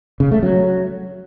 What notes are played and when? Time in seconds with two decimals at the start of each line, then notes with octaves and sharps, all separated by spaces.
0.20 C#3
0.31 A3
0.43 F#3